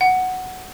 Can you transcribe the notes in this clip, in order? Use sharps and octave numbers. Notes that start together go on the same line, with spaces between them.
F#5